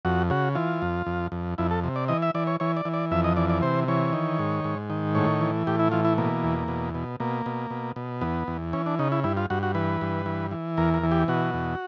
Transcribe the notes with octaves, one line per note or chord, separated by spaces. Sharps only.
F2 F#4
C#3 F#4
E3 F4
F2
F2
F2
F2 E4
A4
C3
D5
E3 D#5
E5
E3 D5
C#5
E3 C#5
D5
E3
D5
F2 E5
D#5
E3 D5
D5
C3 C5
E3 C#5
D#3
G#2
G#2
D#3
A2 C#5
E3
A2 G4
E4
E3 F4
E4
B2 A#3
E2
B2
B2
B2 A#3
B2
B2
B2
E2 B3
E2
E3 C#4
D4
C#3 D#4
E4
G2 E4
F4
G2 F#4
F#4
E3 B4
G2
E3
E3
E2 A#4
A#4
E3
G4
B2 F#4
E2